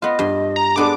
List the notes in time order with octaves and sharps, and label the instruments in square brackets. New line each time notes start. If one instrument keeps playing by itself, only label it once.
[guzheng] B3 F4 [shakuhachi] D#5
[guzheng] G2 C6
[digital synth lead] A#5
[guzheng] G#3 B3 A4 [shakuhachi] D4 [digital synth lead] D6